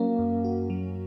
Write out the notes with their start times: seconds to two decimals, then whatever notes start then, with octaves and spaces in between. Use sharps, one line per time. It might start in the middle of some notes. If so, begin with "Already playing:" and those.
Already playing: F#3 A#3 C#4 F#4
0.19 F#2
0.44 F#4
0.70 F#3